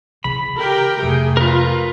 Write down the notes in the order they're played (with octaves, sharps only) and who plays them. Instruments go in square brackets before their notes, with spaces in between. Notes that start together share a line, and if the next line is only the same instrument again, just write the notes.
[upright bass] C#3 E3 [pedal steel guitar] B5
[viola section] G4 A#4 G5
[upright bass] F2 C3 [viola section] A3 G#4
[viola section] F4 [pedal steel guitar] A#4 B4